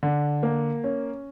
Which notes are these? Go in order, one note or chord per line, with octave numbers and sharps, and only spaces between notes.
D3
A#3
C#4